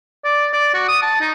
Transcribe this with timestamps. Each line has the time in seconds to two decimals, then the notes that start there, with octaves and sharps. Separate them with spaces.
0.24 D5
0.53 D5
0.74 F#4
0.88 D#6
1.02 A5
1.21 D#4